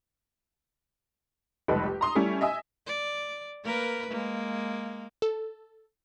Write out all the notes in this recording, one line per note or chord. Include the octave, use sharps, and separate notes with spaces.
F1 C#2 G3 D#4 A4 B4
G4
A#5 C6 D#6
G3 A3 C#4 E4
D#5 E5 G#5 E6
D5
A#3 A#4 B4
G#3 A#3
A4